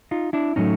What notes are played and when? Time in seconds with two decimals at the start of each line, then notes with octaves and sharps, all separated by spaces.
0.11 D#4 F4
0.33 D4 E4
0.56 A2 F#3 A3 C#4 D#4